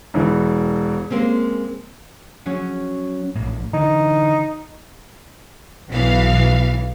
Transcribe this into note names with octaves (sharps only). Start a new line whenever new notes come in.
E1 E3
G#3 A#3 C4 C#4
F#3 C#4
A#1 A2
D3 E3 D#4
B1 E3 B3 F5